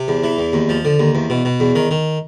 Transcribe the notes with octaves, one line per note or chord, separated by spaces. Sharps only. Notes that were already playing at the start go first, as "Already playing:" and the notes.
Already playing: C3
E2
E3
E2
D#2
F3
D3
D#2
E2
B2
B2
E2
D#3
D#3